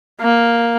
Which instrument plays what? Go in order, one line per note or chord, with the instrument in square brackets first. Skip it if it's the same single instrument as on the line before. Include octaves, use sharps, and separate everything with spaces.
[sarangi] A#3